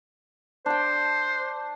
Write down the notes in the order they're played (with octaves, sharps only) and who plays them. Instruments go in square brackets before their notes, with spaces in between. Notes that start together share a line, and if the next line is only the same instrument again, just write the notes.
[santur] D4 G5 [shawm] C5